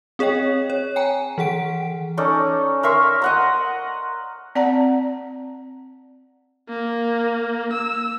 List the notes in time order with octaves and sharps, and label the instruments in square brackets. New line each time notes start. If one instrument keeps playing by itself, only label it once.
[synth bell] C4 G#4 C#5 D#5 G5
C#5
G5 G#5 A#5
E3 G#4 F#5 D7
[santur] C#4 D#4 A4 D5
A#4 E5 C6 C#6
D#5 F#5 A#5
[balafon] C4 D5 F#5 A5 A#5
[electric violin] A#3
E6